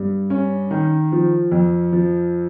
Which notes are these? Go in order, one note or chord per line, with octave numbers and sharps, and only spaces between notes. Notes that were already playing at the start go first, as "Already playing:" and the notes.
Already playing: G2 G3
C#4
D#3
F3
F2
F3